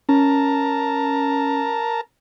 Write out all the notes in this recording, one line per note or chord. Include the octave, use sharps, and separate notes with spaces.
C#4 A#4 A5 A#5